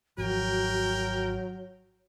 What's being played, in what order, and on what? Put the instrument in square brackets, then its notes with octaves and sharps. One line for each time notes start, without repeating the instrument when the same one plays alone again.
[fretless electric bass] G#1 F3 [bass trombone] F#3 [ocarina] F#4 [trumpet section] A#4 G5